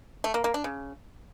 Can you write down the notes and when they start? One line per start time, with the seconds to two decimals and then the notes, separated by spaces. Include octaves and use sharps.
0.24 A3
0.34 A#3
0.44 A#3
0.54 D4
0.64 C#3